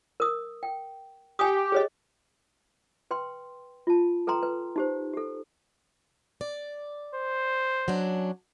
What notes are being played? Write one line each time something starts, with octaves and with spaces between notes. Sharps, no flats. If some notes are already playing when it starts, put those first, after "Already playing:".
A#4 D#6
G5
G4 G5 G#5 D#6
G#4 C#5 D#5
B4 G5 C6
F4 A5
A4 B4 G5 A#5 C6
B4
D#4 G4 C5
G4 A4
D5
C5
F#3 C#4 D4